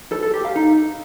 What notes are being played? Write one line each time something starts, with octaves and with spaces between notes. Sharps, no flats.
A4
A4
G4
F5
D#4